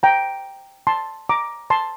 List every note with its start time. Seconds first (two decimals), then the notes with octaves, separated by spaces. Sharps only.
0.03 G5 A#5
0.87 A5 C6
1.29 A#5 D6
1.70 A5 C6